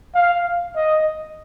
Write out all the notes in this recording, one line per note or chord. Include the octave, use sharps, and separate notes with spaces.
F5
D#5